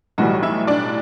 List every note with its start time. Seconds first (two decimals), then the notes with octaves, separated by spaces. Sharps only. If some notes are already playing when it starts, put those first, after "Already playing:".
0.18 B1 A2 E3 G3 F#4
0.43 E4 E5
0.67 D4 D5